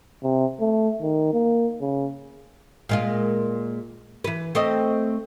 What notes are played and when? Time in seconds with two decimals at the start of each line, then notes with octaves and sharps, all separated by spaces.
0.23 C3
0.60 A3
1.01 D#3
1.33 A#3
1.81 C#3
2.89 A#2 G#3 F4
4.24 E3 B4
4.55 A3 C4 D#5